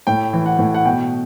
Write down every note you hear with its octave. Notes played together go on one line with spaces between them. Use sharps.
A2 G5
E3
F#5
A2
F#5
B2 G5